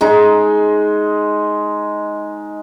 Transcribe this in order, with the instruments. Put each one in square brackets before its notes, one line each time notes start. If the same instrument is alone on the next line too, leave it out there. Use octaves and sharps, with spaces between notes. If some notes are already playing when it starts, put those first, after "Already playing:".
[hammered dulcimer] G#3 D#4